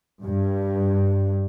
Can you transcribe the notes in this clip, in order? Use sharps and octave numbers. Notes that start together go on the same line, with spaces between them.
G2